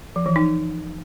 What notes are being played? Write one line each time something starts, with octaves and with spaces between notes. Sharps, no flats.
F3
E3
D#4